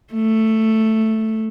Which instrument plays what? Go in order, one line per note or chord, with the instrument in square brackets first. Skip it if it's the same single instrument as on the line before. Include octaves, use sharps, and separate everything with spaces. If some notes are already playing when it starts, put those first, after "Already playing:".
[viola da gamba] A3